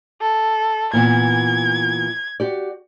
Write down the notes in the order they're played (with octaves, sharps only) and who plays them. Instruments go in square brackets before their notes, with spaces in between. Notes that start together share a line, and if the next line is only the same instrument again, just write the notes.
[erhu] A4
[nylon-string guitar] A#2 E3 B3 [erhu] G#6
[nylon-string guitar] F#4 G4 D5